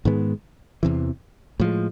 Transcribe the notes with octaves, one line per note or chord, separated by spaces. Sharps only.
G#2 D#3 G#3 B3
E2 C3 E3
A2 F3 G#3